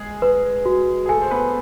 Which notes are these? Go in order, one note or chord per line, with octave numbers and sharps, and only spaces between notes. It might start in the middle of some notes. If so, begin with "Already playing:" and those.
Already playing: G#3 G#4
B4
F#4
G#4
A3 A4 G#5
C5
B3 B4